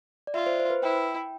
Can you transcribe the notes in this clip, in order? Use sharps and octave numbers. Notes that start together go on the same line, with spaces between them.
D5
F4 E5
C5
C5
B4
E4 G5